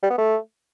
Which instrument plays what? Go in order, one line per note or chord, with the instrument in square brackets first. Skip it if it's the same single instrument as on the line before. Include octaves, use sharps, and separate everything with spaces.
[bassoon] G3
B3
A3